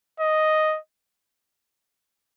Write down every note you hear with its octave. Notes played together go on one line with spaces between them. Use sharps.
D#5